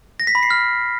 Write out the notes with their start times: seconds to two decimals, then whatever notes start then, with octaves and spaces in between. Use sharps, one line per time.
0.20 A#6
0.27 B6
0.35 B5
0.43 C7
0.50 F6